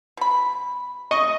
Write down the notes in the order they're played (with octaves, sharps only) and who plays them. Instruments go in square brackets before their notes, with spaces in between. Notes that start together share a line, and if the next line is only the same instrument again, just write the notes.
[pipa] B2 B5
[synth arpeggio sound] D#5 [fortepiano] C#6